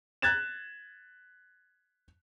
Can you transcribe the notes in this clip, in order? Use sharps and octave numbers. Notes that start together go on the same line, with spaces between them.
F#6 G#6 A6 E7